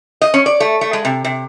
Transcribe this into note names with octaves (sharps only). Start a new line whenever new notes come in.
D#5
C#4
D5
A3
A3
G#3
C3
C3